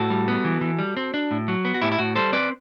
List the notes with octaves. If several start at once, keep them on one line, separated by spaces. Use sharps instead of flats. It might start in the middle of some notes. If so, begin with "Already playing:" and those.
Already playing: A2 F#4 A4
G3
B3
E3
E3
G3
C4
D4
A2
F#3
B3
F#4
A2 E4 G4
E4
A2 F#4
G3 A4 C5
C4 B4 D5